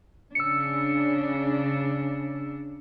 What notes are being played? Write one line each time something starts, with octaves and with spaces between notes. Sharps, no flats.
C#3 D4 E6 C#7